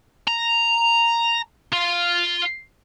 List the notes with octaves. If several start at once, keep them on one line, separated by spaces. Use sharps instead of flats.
A#5
F4